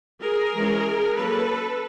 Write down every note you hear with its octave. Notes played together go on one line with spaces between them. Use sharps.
G#4 A#4
E3 G#3 C#4
F#3 A#3 C#4 A4 B4